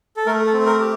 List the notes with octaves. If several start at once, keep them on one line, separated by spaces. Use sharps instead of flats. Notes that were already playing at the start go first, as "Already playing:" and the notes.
A4
A3 A#4
A4
C4
A#4
G4